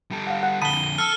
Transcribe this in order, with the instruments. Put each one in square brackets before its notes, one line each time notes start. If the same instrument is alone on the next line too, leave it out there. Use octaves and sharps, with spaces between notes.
[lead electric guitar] G3 A4
[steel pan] F5 F#5
F#5
[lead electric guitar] F2 D3 [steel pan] A5 B5 D#6 [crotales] D#7 G7
[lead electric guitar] A4 [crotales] E6 F6